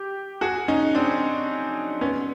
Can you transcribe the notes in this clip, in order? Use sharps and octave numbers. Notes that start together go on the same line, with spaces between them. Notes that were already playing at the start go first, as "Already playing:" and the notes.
Already playing: G4
F#4 G#4
C#4 D#4
C4 D4
B3 C#4